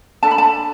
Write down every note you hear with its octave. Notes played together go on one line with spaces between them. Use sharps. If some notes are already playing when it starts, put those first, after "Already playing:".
D4 A4 A5
B5
A5